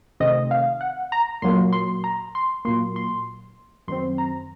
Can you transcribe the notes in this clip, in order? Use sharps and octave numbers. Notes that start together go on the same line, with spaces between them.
C3 D#3 A3 C4 D#5
F5
F#5
A#5
A#2 F#3 A#3 C6
C6
A#5
C6
A#2 F#3 A#3 C6
C6
F#2 D#3 F#3 C4 C6
A#5